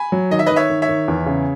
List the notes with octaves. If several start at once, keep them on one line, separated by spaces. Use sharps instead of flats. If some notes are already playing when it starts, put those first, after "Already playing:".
Already playing: G#5 B5
F#3
D#3 D#5
E5
D#3 B4 D#5
C#5 E5
D#3
C#5 E5
D#3
E2
C#3